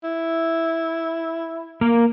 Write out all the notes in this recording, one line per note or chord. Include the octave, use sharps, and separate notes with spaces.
E4
A#3 A#4